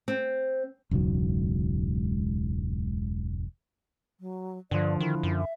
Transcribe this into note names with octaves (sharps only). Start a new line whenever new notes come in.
C4
E1 C#2 G#2 F#3
F#3
G2 D3 F3 D5
D#3 E4
F#2
E5